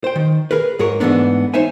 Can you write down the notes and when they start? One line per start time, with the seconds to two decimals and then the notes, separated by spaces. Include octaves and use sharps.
0.04 C5 G5
0.16 D#3
0.51 G#4 A#4 B4
0.79 G#2 G#4 A#4 C#5
1.00 G#2 B2 E3 A3 B3 D4
1.54 D#4 C5 C#5 E5 G#5